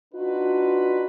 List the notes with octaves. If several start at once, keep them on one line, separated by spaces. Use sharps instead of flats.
D4 D#4 F4 F#4 B4